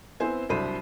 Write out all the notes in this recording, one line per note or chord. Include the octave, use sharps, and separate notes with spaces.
B3 C4 E4 C5 G#5
C2 F#3 D4 C5 B5 D#7